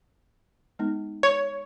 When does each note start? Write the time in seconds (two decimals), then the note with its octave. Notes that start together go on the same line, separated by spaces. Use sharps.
0.79 G#3 B3 D#4
1.23 C#5